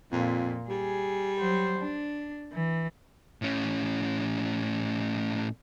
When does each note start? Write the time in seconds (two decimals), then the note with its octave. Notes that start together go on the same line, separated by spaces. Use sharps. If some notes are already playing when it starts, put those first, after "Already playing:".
0.12 F2 A#2
0.69 G3 G#4
1.39 F#3 C5
1.79 D4
2.52 E3
3.42 A2 C#4